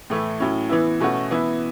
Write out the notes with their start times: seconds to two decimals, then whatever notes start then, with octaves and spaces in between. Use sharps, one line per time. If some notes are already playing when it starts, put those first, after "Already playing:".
0.10 A2 E3 A3 E4
0.40 A2 F#3 C#4 E4
0.69 E3 B3 E4
1.00 B2 A3 C#4 F#4
1.31 E3 B3 E4